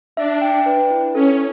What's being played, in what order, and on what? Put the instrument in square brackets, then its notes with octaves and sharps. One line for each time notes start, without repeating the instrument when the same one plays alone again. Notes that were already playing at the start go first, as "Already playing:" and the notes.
[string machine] D4 [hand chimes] E5
[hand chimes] G5
B4
E4
[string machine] C#4 [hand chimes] A4